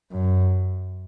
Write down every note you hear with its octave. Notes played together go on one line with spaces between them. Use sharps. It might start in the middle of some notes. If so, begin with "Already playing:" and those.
F#2